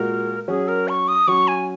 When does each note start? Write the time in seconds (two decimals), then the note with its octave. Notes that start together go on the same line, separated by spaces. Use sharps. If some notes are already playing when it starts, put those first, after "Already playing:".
Already playing: A#2 G#3 F#4 A#4
0.48 F#3 C#4 F#4 G#4
0.68 A#4
0.89 C#6
1.08 D#6
1.27 F#3 C#4 F#4 C#6
1.48 G#5